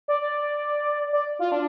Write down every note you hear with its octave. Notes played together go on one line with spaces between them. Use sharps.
D5
D5
F4
D4